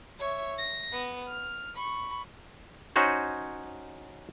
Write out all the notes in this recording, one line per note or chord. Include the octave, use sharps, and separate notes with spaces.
C#5 E5
A#6
B3
F6
B5 C#6
C#4 D#4 F#4 C5 C#5